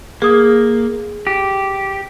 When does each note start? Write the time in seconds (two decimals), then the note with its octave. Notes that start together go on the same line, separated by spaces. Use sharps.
0.22 A#3 G#4 D#6
1.27 G4